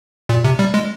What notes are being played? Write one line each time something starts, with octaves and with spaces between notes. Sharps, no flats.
A#2
C3
G3
G#3